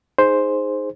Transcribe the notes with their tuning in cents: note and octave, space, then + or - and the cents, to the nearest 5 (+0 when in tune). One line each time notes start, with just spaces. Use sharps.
D#4 +0 G#4 +0 C5 +0